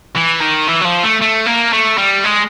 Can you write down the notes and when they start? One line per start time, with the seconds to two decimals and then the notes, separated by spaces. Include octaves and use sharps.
0.17 E3
0.42 D#3
0.68 E3
0.81 F#3
0.85 F3
1.03 A3
1.21 A3
1.46 A#3
1.73 A3
1.98 G3
2.25 G#3